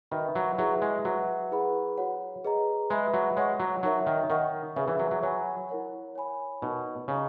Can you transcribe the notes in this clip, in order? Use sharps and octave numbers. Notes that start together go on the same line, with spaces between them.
D#3 F#4 B4 E5 B5
F#3
F#3 E4 G#4 B4 E5
G#3
F#3 F#4 B4 E5
E4 G#4 B4 F#5 B5
F#4 C#5 F#5
G#4 B4 D#5 A#5
G#3 B4 E5 B5
F#3
G#3 C#5 F#5 C#6
F#3
F#3 D#4 A#4 C#5 E5
D#3
D#3 A#4 D#5 F#5 C#6
C#3 G#4 B4 E5
E3
F#3
F#3
F#3 C#5 G#5 B5
E4 A#4 C#5 F#5
C#5 G#5 B5
B2 D#4 F#4 A#4
C#3 G#4 D#5 A#5